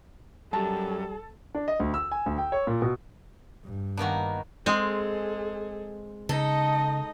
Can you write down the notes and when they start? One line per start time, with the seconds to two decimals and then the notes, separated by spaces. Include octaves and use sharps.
0.53 F#2 G3 A4 A5
1.55 D4
1.68 D#5
1.80 D2
1.94 E6
2.12 G#5
2.26 D2
2.38 G5
2.52 C#5
2.67 A#2
2.82 B2
3.64 G2
3.97 D#3 A#3 B3 D4 F#4
4.66 G#3 C4 G#4 A4
6.29 C#3 D#4 A4 D#5